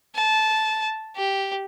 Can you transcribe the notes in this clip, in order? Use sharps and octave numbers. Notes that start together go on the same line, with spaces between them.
A5
G4